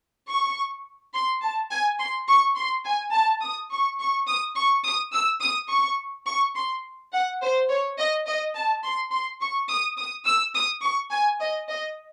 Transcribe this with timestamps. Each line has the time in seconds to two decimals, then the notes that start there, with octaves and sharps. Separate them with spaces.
0.29 C#6
1.13 C6
1.42 A5
1.71 G#5
1.99 C6
2.28 C#6
2.56 C6
2.85 G#5
3.13 A5
3.42 D#6
3.71 C#6
3.99 C#6
4.28 D#6
4.56 C#6
4.84 D#6
5.13 E6
5.42 D#6
5.69 C#6
6.27 C#6
6.55 C6
7.13 F#5
7.42 C5
7.69 C#5
7.98 D#5
8.27 D#5
8.55 A5
8.83 C6
9.12 C6
9.41 C#6
9.69 D#6
9.98 D#6
10.26 E6
10.54 D#6
10.83 C#6
11.11 G#5
11.40 D#5
11.69 D#5